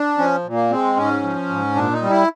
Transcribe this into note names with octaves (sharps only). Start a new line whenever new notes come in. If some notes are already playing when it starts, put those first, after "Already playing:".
Already playing: D4
F3 C#4
A#2
A#3
G#3 C4
G#2 C#4
F3
G#2
A#2 D4
D#4
G3
E4